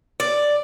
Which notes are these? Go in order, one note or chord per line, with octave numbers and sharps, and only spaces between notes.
D5